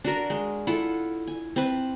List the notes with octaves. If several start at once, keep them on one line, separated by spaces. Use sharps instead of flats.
D4 F#4 A#4
G#3
E4 F4 A4 F#5
G#5
C4 B4 A5